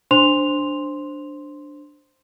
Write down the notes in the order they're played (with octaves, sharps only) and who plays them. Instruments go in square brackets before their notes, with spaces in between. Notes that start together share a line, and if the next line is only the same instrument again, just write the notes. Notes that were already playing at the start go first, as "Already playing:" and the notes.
[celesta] D4 C5 C6 F7